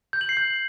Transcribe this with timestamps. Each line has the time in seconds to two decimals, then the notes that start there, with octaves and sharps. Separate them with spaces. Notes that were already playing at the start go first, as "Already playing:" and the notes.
0.13 G6
0.21 F#7
0.29 C7
0.37 G6